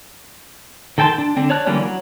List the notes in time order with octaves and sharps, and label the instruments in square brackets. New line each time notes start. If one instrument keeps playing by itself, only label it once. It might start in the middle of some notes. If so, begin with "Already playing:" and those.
[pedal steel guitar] D#3 A4 G5 A5 C6
D4
D3 C4
C#5 D5 A5 F#6
D3 E3 G3 A#3 C#4
F#3